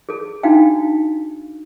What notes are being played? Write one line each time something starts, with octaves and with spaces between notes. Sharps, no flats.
G#4 A4
D4 D#4 F#4 F5 G5